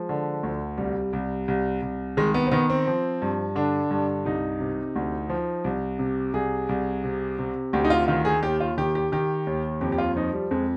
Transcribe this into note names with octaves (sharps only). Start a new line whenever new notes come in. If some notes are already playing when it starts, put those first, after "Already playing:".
Already playing: F3 G#3
D3
D2
C2 G3
C2
C2
C2
D#3 G#3
B3
C4
D#3 B3
C4
F3
G2
D3 D4
G2
C2 D#4
C3
D2
F3
C2
C3
C2 G#4
C2
C3
C3
D2 G4
D#4
F4
D#3 F4
G#4
D#2 G4
F4
D#3 G4
G4
D#3 G4
D#2
F2 G4
G4
F4
F3 D#4
G3
F2 G#3